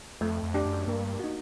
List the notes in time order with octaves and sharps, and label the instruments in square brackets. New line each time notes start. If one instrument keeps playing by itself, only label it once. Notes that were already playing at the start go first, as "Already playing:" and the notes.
[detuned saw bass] F2 [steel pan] A3
[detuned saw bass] F2
[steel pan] D4 G4
[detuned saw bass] F#2
[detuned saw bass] G2 [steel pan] A#3
[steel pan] D#4 F#4